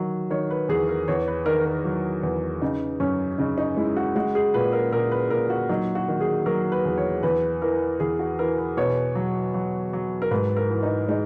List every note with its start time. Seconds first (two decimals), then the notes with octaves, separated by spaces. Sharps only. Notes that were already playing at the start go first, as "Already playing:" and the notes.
Already playing: D#3 F#3
0.30 D#3 C#5
0.50 B4
0.69 E2 G#4
0.89 A#4
1.08 E2 C#5
1.28 B4
1.46 D#3 A#4
1.65 A#4
1.85 F#3
2.23 E2
2.62 C#3 D#4
3.00 F#2 C#4
3.38 C#3 D#4
3.58 D#4
3.77 G#3 E4
3.96 F#4
4.15 G#3 F#4
4.35 G#4
4.54 A#2 B4
4.73 A#4
4.92 A#2 A#4
5.12 B4
5.30 A#2 A#4
5.50 F#4
5.69 F#3 D#4
5.95 F#4
6.08 D#3
6.21 G#4
6.46 F#3 A#4
6.72 B4
6.85 E2
6.98 C#5
7.23 E2 B4
7.62 E3 A#4
8.00 E2 G#4
8.19 F#4
8.39 E3 A#4
8.58 B4
8.77 B2 C#5
9.16 F#3
9.54 F#3
9.93 F#3
10.22 A#4
10.31 G#2 B4
10.57 A#4
10.70 E3
10.83 D#4
11.08 G#3 D#4